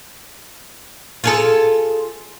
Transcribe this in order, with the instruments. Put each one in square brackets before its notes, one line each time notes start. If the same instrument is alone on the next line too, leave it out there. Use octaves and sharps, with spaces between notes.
[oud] F4 G#4 A4